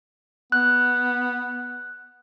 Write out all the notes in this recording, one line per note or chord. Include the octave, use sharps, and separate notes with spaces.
B3 F#6